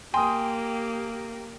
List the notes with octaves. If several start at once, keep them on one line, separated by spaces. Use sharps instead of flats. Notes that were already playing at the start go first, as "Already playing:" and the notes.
A#3 G4 G5 G#5 C6 D#6